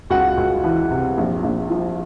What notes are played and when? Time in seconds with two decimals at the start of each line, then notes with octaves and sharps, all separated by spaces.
0.10 C#2 F#4 F#5
0.37 C#2
0.64 E3
0.91 C3
1.17 A#1
1.43 A#1
1.70 F3